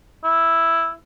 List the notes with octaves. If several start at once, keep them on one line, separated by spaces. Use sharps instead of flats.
E4